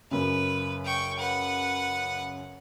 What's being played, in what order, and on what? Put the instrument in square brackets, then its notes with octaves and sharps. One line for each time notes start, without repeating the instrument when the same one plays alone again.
[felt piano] F#2 C#3 [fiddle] B4
[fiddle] G5 C#6
B4 F#5